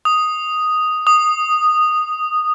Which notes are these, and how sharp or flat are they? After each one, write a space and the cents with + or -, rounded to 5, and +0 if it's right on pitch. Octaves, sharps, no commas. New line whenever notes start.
D#6 +0
D#6 -10